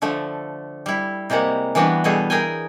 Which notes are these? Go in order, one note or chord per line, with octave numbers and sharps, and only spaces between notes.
D3 F3 A3
G3 E4
C3 G3 G#3 A#3 F#5
E3 G3 B3 D4 F#4
B2 G3 A3 G#4 A4
G#4 A#4 G5 G#5